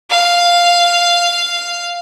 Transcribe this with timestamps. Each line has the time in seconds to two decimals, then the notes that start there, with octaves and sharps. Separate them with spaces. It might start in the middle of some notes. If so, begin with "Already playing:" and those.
0.10 F5